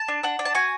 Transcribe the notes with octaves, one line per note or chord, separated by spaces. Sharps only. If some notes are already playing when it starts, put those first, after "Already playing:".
Already playing: A5
D4
D4 F#5
D4
A5
F#4 G#5